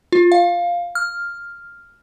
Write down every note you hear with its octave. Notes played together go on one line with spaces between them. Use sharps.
F4
F5
F6